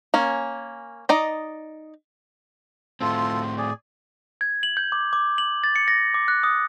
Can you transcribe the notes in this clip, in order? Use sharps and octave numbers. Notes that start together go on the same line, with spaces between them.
A#3 C#4
D#4 D5 D#5
A2 C4 F4 A4 C6
G#4 D5 G#5
G#6
F#7
G6
D6
D6
F#7
A6
C#7
A#6
D6
F#6
D#6